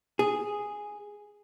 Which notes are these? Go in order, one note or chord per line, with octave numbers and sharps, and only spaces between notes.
G#4